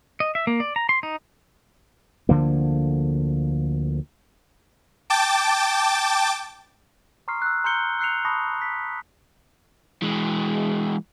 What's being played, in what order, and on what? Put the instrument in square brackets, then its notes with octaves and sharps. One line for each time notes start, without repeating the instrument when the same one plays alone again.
[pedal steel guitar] D#5
E5
A#3
D5
A#5
C6
D#4
[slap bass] D2 D3 F3 A#3
[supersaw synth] G5 A5 D6 A6
[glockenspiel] A#5 C6 C#6 D#6 F6 C7
E6 F#6
A#5 C6 F6 G6 C#7 G7
E6 F#6 C7 C#7 F7
A5 B5 C#6 D#6 A#6
B6
[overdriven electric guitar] E3 G#3